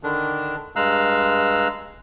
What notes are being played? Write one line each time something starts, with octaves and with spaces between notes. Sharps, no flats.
D3 D#3 D4
G2 G#3 F5 A#5 E6 F#6